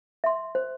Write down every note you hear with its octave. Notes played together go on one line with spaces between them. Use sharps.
E5 C6
C5